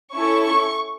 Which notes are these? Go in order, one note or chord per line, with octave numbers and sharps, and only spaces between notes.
C#4 E4 A4 C#6